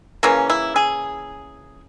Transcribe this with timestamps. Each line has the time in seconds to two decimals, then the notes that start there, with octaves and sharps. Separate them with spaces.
0.23 C#3 E3 A#3 C#4
0.50 E4
0.76 G#4